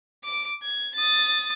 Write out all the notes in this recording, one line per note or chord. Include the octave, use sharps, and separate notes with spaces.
D6 D7
G#6
D#6 A6